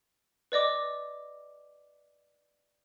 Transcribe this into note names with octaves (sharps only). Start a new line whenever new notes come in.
B4 D5 D#5 D6